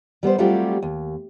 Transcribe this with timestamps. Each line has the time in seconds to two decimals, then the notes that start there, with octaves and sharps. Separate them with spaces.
0.23 G3 B3 A#4 C5
0.38 F#3 G3 A3 C4 F4 G4
0.83 D#2